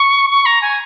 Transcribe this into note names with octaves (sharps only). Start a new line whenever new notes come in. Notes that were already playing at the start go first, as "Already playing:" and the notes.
Already playing: C#6
C#6
A#5
G#5